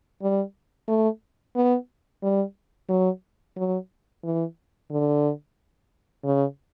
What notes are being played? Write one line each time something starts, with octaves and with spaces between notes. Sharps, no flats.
G3
A3
B3
G3
F#3
F#3
E3
D3
C#3